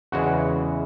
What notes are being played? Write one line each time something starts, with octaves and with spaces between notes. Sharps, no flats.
E2 C#3 E3 G#3 F#4